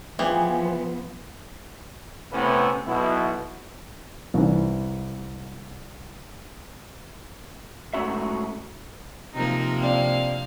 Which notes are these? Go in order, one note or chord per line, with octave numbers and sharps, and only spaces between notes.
E3 F3 B3 G4 G#4
A2 C3 B3 C#4 E4 B4
B1 B2 E4
C2 E3
G#2 A3 C#4 F#4 E5
C3 F3 A#3 D#4 A#4
C4 D4 F5